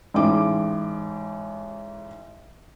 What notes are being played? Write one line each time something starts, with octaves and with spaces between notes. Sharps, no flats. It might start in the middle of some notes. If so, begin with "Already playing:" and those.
A1 G#2 D6